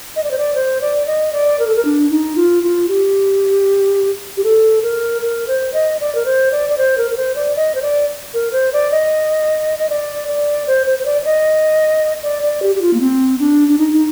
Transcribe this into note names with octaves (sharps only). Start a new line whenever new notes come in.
D#5
D5
C5
D5
C5
D5
D#5
D5
A#4
A4
A#4
D4
D#4
F4
F4
G4
G4
A4
A#4
A#4
C5
D#5
D5
A#4
C5
D5
D5
C5
A#4
A#4
C5
D5
D#5
C5
D5
A#4
C5
D5
D#5
D#5
D5
D5
C5
C5
C5
D5
D5
D#5
D5
D5
G4
G4
F4
A#3
C4
D4
D4
D#4
D#4